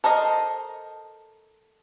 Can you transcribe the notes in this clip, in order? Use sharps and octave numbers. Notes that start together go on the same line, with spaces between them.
A4 A#4 C5 D#5